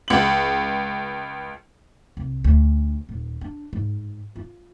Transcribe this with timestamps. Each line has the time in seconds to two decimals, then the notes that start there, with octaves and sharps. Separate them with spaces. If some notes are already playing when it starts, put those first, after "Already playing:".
0.08 C#2 F#7
2.17 C2
2.44 D2
3.09 D#1
3.41 D4
3.73 G#2
4.36 F4